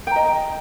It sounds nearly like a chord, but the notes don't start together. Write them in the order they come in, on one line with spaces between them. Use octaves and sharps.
G5 A#5 D#5